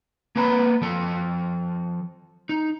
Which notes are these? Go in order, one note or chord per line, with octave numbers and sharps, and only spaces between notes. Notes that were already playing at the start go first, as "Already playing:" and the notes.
A#3 B3 B4 A#5 B5
F3 A4
D#4